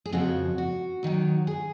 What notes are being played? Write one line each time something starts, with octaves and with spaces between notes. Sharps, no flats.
G#4
F2 C#3 F3 F#4
F#4
D#2 D#3 F#3
G#4